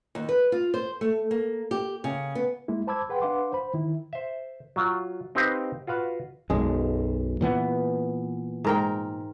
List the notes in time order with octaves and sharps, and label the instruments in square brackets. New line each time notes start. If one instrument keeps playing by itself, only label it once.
[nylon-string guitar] D#2
B4
F4
C5
A3
A#3
G4
C#3
B3
[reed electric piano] G#3 A#3 E4
C5 A5 B5 D6 E6 G#6
G#4 B4 F#5 G5 C6
D4 B4 F5 F#5 C6 D6
C5 B5
D#3 E4
[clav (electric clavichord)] C5 E5
F#3 F4
C4 D#4 G4 B4 C5 F5
F4 F#4 B4 F5
[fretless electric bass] B1 F#2 [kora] G#3
[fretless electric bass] A#2 E3 B3
[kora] G#2 A#4 G5